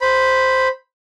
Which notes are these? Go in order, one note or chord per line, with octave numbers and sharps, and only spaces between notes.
C5 B5